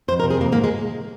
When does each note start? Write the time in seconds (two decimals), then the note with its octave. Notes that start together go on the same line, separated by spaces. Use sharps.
0.08 F2 C5
0.20 A#4
0.24 C3
0.31 G#4
0.37 F2 A#3
0.52 G#2 A#3
0.64 G#3